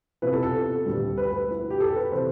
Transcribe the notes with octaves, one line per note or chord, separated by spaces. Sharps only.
C3 F3 B3 E4 B4
A4
A4
D2 D3 G3
B4
B4
B2 B3 E4
G4
A4
B4
C3 E3 C5